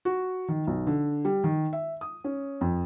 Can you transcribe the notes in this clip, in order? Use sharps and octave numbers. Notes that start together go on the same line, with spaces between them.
F#4
D#3
B1
D3
G3
D#3
E5
D#6
C#4
F2